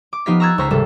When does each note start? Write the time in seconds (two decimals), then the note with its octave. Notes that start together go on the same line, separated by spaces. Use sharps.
0.13 D6
0.26 F3 B3 D#4 G4 F5 B6
0.40 A#5 C#6 E6 F#6 G#6 A6
0.58 C#2 G#3 C5 A#5 C#6 B6
0.70 G#1 C3 G3 A4 C5